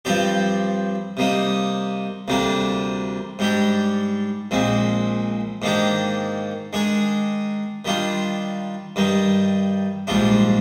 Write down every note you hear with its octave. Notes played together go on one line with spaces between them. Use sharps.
G2 F3 C4 G4 D5
C3 G3 A#3 D#4
D2 C3 G3 A#3 D4
G#2 G3 D4 G4
A#1 A#2 G#3 C4
G#2 D#3 A#3 D4 G4
D#3 G#3 D4 G#4
D#3 G3 D4 F4
G2 D#3 G3
A#1 G#2 G3 D4 F4